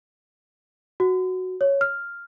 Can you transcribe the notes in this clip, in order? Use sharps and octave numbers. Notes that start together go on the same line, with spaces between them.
F#4
C#5
F6